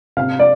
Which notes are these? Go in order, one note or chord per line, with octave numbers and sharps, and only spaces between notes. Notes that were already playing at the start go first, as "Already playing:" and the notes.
C3 F5
D5